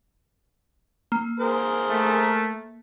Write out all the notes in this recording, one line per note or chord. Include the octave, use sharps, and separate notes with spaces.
A#3
G#4 A#4 C5
A3